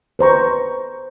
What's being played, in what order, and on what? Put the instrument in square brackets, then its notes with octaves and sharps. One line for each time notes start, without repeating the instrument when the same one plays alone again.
[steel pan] B4 C5 A#5 C#6